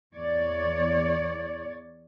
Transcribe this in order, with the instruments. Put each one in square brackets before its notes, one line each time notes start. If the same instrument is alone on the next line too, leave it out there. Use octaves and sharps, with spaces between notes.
[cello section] E2 C#5 D5